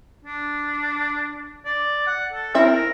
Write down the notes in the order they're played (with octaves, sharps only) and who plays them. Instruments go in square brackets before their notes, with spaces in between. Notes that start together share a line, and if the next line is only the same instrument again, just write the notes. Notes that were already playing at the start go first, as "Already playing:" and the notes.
[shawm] D4
D5
F#5
A4
[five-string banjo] C4 E4 E5 [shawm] A#4